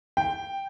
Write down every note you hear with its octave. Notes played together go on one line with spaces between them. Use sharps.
G5